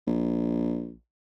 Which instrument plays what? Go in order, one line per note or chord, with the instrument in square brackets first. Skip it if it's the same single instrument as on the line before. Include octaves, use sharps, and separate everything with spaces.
[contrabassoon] A#1